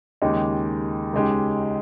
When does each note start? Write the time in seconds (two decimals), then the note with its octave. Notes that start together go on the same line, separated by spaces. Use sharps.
0.22 D#2 C#3 G#3 D#4 G4
1.13 C#2 C#3 G#3 D#4 G4